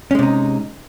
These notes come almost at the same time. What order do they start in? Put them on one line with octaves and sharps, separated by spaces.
C#4 G#3 C3 D#4